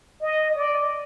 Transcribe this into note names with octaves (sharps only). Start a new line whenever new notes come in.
D#5
D5